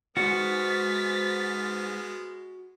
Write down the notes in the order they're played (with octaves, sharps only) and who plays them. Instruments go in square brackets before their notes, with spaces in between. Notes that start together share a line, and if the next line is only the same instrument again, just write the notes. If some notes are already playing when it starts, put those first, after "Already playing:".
[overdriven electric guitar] D2 G#2 [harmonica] G#3 B3 F6 [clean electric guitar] F#4 [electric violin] A6 B6